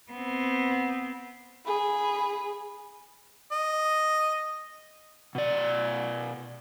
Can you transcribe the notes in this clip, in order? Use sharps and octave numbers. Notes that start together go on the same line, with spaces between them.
B3 C4
G#4 B5
D#5
B2 D5